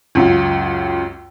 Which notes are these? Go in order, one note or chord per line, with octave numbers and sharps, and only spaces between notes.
C#2 F#2 F4